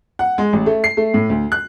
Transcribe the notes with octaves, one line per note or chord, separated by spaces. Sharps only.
F#5
G#3
A1
A3
C7
A3
A2
D2
F#6